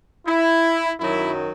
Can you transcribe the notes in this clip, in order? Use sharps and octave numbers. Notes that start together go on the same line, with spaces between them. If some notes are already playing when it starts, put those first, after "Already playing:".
E4
F#2 D#3 F#3 E4